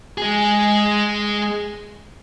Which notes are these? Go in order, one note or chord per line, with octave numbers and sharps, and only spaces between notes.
G#3 G#4